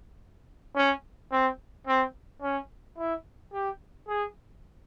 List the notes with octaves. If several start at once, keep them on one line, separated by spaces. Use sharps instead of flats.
C#4
C4
C4
C#4
E4
G4
G#4